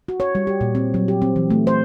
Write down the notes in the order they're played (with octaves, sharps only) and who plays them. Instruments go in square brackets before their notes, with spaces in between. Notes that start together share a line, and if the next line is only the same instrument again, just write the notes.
[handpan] F#4
C#5
G3
G4
A#2
C4
F#3
G4
C4
E3
A3
C5